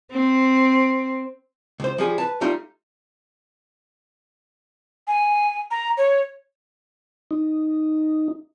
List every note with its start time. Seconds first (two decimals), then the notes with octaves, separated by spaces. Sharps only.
0.12 C4
1.80 C#2 C5
1.98 F3 G3 G#4
2.18 B4 A5
2.41 G3 A3 D#4 F4
5.07 G#5
5.71 A#5
5.97 C#5
7.31 D#4